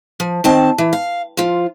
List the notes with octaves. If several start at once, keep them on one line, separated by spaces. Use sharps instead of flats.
F3
D#3 C4 A5
E3
F5
F3 F4